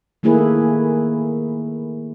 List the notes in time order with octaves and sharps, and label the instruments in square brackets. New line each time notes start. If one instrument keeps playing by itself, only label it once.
[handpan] D#3 A3 A#3 E4 G#4 B4